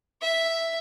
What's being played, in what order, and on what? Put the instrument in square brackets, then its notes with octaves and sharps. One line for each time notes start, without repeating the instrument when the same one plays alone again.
[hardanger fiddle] E5